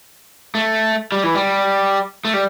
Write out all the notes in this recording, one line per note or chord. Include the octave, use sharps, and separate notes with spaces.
A3
G3
E3
G3
A3
G3